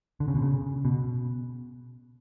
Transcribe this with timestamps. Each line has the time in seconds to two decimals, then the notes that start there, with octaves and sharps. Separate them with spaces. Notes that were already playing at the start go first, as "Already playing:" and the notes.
0.20 D3
0.28 C#3
0.35 B2
0.42 C#3
0.85 B2